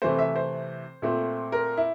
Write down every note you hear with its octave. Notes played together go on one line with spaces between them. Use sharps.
C3 E3 A3 C5
E5
C5
A#2 A3 C4
A#4
E4